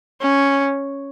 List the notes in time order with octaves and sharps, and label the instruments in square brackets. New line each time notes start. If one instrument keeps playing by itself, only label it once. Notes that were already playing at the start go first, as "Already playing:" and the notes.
[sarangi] C#4